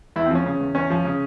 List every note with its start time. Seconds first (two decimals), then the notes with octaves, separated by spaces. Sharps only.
0.16 E2 E4
0.26 C4
0.31 F3 C#4
0.46 C#3
0.60 E2
0.75 E2 C#4
0.90 F3
1.05 C#3